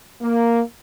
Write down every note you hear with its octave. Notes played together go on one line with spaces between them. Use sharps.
A#3